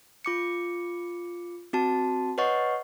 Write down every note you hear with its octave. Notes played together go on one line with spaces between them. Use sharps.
F4 D6 C#7
C4 F#4 A5
B4 C#5 D#5 F#5 C#6